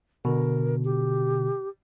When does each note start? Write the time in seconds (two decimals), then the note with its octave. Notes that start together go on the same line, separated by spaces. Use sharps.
0.25 B2 D3 A#4
0.84 G4